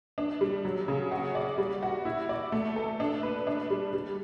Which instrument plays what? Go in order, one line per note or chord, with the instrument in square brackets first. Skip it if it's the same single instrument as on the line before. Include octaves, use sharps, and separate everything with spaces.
[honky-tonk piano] D4
G3
F#3
C#3
F#4
D5
G3
F#4
E4
D5
A3
A4
D4
B4
D4
G3
G3